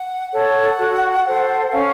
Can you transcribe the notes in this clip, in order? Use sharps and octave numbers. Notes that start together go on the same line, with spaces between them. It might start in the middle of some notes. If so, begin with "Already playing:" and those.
Already playing: F#5
A4 C#5 F#5
F#4
A4 C5
C#4 F5